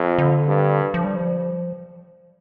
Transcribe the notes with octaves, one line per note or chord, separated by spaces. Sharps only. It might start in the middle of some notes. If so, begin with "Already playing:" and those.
Already playing: F2
D3
G2
F3
G3
F3